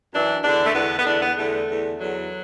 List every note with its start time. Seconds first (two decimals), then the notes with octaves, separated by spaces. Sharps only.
0.13 F#2 E3 D4
0.43 E2 D3 D4
0.66 A3
0.74 E2 D3 B3
0.99 B3
1.06 E2 D3 D4
1.22 B3
1.37 E2 D3 A3
1.69 E2 D3
1.99 E2 D3 F#3